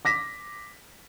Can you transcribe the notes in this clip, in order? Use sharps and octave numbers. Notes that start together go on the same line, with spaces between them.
D6 A#6 B6